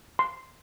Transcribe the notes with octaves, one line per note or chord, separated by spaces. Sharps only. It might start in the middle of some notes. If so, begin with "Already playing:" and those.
C6